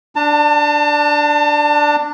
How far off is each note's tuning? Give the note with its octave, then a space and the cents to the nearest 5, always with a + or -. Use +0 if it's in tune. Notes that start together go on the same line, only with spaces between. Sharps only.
D4 +0 A5 +35